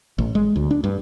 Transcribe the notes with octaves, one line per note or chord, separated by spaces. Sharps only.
A1
G#3
D2
D4
G2